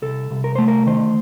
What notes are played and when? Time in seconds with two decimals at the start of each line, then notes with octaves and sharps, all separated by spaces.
0.02 C2 A4
0.31 C2
0.44 A#4
0.55 A3 C5
0.68 A#4
0.86 D#3 C5